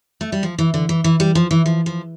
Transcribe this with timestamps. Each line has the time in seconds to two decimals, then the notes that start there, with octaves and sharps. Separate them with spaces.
0.21 A3
0.32 G3
0.43 F3
0.58 E3
0.74 D3
0.89 E3
1.04 E3
1.20 G3
1.35 F3
1.51 E3
1.66 F3
1.86 F3